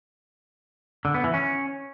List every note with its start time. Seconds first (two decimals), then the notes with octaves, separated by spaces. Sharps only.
1.05 D3
1.14 B3
1.24 E3
1.34 C#4